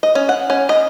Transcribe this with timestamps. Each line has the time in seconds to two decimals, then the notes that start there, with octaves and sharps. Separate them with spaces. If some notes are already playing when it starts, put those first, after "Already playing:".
0.03 D#5
0.15 C#4
0.29 F#5
0.50 C#4
0.69 D#5